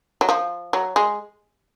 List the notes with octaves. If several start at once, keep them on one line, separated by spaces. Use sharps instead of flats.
F#3
F3
F#3
G#3